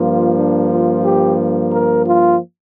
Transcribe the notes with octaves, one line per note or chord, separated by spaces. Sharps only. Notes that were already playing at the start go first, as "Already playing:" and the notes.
Already playing: G2 F3 A#3 F4
D4
F4
G4
A#4
F4